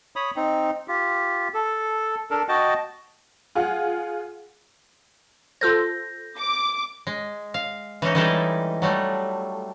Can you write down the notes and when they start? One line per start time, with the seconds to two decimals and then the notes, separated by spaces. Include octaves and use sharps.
0.16 C#5 B5 D#6
0.36 C4 D#4
0.88 F4 G4
1.54 A4
2.31 D4 A4 A#4
2.49 F#4 D#5 G5 A5
3.55 F4 G#4 F5 F#5
5.61 F4 A4 C5 G6 A#6
6.37 D6
7.07 G#3
7.54 F5
8.02 E3 G#3 C#4 D#4
8.15 E3 G3 G#3 D#4 E4 A4
8.82 F#3 G3 A3